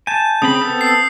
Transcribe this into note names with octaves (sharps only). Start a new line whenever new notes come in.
G#5 A5 G6
C#3 C4 B5 D#6
B3 C4 A4
E6 C7